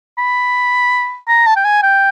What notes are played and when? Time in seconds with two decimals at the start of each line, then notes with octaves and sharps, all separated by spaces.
0.18 B5
1.28 A#5
1.46 A5
1.56 G5
1.65 G#5
1.83 G5